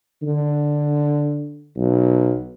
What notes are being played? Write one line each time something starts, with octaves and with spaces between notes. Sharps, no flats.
D3
B1